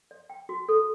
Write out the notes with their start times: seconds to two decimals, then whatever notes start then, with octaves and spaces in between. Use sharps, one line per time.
0.11 D5
0.30 G5
0.49 F#4
0.69 A4